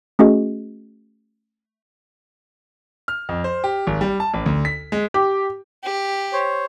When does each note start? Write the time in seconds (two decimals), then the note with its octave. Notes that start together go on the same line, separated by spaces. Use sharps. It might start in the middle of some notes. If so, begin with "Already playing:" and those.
0.19 A3 C#4 F#4 G#4 D#5
3.08 F6
3.29 F2
3.44 C5
3.64 G4
3.87 G#1
4.01 G3
4.20 A5
4.34 A1
4.46 D2
4.65 B6
4.92 G#3
5.14 G4
5.84 G4
6.33 C5 C#5